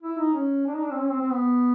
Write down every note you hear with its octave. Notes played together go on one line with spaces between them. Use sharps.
E4
D#4
C#4
D4
D#4
D4
C4
C#4
C4
C4
B3